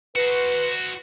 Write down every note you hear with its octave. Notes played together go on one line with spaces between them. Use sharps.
F#4 B4 C5